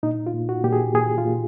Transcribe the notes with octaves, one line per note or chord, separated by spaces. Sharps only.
A#2 D#4
F4
A#2
F#4
A#2 G4
G#4
A#2 G#4
F4
A#2